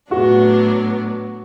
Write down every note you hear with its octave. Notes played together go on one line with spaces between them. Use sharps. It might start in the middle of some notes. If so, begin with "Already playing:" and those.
A2 F#3 B3 D4 F#4